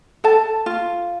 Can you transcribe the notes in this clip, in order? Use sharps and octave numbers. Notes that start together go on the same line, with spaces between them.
A4 A5
F4